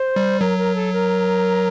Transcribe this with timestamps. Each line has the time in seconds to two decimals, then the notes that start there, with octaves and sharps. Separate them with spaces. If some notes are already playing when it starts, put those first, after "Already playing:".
Already playing: C5
0.16 G3
0.40 F#3 A#4
0.58 A#4
0.75 A4
0.93 A#4